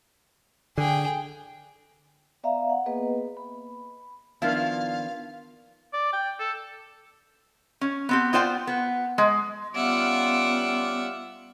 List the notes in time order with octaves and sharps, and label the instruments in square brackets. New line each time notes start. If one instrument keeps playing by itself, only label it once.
[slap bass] D3 [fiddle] G#4 G5
[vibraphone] B3 D5 E5 F5 A#5
F#5
A#3 B3 G#4 B4 D#5
B5
[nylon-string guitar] D#3 B3 D4 [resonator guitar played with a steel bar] F3 E4 F4 [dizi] F5
[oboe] D5
G5
A4
[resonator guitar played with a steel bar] C#4
B3 C4 G4
B3 F4 C5 D5 G5
B3
G#3
[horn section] G3 C#4 F4 [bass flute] B3 [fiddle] E5 F#5 [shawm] D6